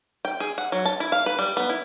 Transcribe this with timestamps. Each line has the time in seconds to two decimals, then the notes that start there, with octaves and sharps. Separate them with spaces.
0.25 G5
0.40 G#4
0.58 F#5
0.72 F#3
0.85 A5
1.00 E4
1.12 F5
1.26 B4
1.39 G3
1.57 B3
1.69 E4